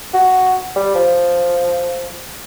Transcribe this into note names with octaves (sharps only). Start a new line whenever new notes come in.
F#4
G3
F3